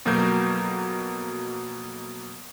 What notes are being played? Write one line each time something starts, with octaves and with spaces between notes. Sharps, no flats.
F2 B2 F#3 A#3 A#4 G6